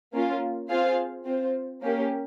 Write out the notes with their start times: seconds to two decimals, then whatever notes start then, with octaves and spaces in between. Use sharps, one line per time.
0.14 A#3 C#4 F4
0.69 C4 F4 G#4 C5 F5
1.25 C4 F4 C5
1.82 A#3 C#4 G4